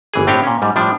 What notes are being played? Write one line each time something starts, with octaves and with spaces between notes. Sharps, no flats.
G1 E3 G#4
A2 C4 D4 F4 G4 C#5
A#2 C#4
G#2 G3
A2 F3 G3 D4